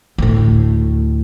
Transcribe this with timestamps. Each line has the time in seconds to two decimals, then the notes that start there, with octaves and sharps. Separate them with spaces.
0.18 D2 A2